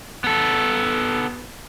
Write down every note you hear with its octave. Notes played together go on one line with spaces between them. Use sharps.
B3 A4